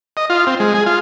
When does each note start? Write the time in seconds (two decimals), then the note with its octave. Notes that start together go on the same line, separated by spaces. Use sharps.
0.17 D#5
0.30 F4
0.47 C4
0.60 G#3
0.74 G#4
0.86 F4